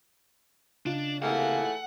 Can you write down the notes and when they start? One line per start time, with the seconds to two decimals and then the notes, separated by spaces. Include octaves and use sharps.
0.86 C#3 D4 D#4 F4
1.22 C3 E3 A3 A#3 G#4 F#5